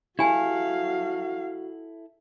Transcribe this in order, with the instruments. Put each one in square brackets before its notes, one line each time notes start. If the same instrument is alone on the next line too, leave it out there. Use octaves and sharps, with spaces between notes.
[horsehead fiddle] F#3 F5 [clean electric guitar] E4 A4 [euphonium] F#4 [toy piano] G4 G#5